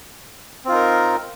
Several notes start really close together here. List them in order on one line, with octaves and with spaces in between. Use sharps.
C4 F4 D#4 A#4